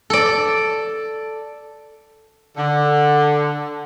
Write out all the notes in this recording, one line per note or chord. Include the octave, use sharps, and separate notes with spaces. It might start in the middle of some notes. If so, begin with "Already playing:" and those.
A4 D5
D3